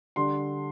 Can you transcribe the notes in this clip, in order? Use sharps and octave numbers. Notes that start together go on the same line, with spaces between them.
D3 G3 D4 C6